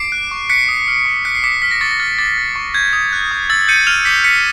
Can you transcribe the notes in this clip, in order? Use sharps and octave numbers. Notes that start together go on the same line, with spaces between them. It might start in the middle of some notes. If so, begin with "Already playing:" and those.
Already playing: D6 C7 D7
F#6
C#6
F#6 B6 C#7
D#6
F6
C#6
F#6 B6 C#7
C7
D6 B6 C#7
F6 B6
A#6
C#6 A6
A#6
F6 A6
D6 A6
F6
C#6
G6 G#6
D#6
F#6
D#6
E6 A6
G6 C#7 D#7
F6 D#7 F7
D6 B6 C#7
G6 B6 C#7